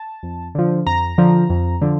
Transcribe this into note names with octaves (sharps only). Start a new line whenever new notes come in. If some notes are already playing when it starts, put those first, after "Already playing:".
Already playing: A5
F2
D3 F3
F2 A#5
D3 F3
F2
D3 F3